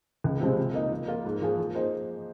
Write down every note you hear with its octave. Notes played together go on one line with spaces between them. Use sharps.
C#2
C3 F3 G#3 C4
F3
A#3 D#4
F3
A#3 F4
G#2
F3 A#3 F4 G#4
F3
A#3 D#4 G#4 C5